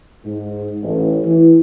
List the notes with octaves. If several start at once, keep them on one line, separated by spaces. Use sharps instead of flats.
G#2
A1
E3